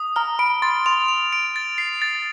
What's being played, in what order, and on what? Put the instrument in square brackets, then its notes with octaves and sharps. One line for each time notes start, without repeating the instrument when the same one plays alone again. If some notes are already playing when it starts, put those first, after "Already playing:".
Already playing: [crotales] D#6
[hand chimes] A#5 [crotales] F6
[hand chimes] B5 [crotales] D7
[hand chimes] C6 [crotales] A6
[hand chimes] C6 [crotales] F7
[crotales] F7
D7
A6
C7
A6